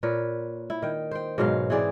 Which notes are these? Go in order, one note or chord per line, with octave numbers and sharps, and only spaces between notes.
A#2 A#4 B4 C#5
E4
D#3 G5
C5 G5
G#2 B2 F#3 F5
E3 C4 G#4 D5